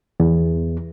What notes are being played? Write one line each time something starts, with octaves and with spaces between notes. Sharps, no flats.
E2